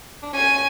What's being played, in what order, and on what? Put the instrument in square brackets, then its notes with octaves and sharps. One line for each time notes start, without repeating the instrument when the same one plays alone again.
[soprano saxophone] D4
[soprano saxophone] C#4 [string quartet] G#5